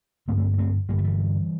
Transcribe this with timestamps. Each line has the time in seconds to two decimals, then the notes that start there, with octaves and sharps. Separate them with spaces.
0.28 G2 D3 A3 C4
0.38 A3 C4
0.53 A#3
0.58 A3 C4
0.89 G2 D3 G3 A#3
0.98 A3
1.04 E3 G3